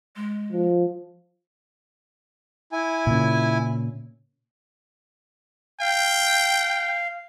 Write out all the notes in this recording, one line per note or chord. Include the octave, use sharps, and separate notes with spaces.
G#3
F3
E4 G#5
A#2 C#3
F5 G5